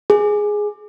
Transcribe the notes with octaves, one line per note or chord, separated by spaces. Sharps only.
G#4